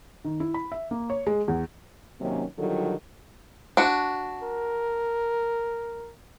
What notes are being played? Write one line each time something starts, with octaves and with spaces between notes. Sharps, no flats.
D#3
E4
B5
E5
A#3
C#5
G#3
E2
C3 D#3 F#3 A#3 C#4
D3 D#3 F#3 G3 F4 A4
D4 F#4
A#4